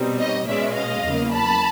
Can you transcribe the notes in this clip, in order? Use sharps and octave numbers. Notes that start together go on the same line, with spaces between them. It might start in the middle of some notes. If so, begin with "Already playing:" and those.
Already playing: B2 G3 C4 D#4
C#5 D#5
B2 G#3 C#4 D5 E5
D#5 F5
E2 C#3 F#3 A#3
A5 B5